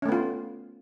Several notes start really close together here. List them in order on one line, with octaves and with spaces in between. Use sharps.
C#4 A3 B3 F4